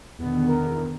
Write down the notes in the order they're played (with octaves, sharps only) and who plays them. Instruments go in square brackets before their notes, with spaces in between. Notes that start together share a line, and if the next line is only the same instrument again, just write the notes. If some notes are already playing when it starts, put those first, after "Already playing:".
[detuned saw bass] E2 [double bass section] B2 D3 D#3 [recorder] B3
[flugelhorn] A#4